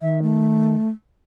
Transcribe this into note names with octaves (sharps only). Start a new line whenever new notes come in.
D#3 E5
A3